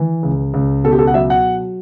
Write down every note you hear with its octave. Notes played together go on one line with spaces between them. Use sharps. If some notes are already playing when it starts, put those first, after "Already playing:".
Already playing: E3
C#2
C#2
B2 A4
G4
A4
F#5
F#3 E5
F#5